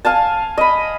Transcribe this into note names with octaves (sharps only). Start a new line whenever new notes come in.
F5 G#5 A5
D#5 B5